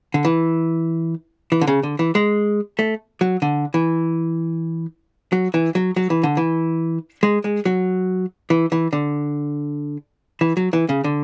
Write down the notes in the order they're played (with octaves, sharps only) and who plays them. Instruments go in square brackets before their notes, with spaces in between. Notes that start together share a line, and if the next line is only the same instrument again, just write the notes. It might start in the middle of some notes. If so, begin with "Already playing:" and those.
[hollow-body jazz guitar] D3
E3
E3
D3
C#3
D3
E3
G#3
A3
F#3
D3
E3
F#3
E3
F#3
F#3
E3
D3
E3
G#3
G#3
F#3
E3
E3
D3
E3
F#3
E3
C#3
D3